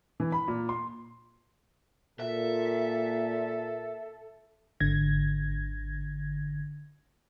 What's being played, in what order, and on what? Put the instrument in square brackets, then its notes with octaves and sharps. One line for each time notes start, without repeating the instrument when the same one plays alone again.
[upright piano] E3
B5
A#2
C6
[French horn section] A#2 [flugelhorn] A4 [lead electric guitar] E5
[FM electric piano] G#1 D3 G#6 A#6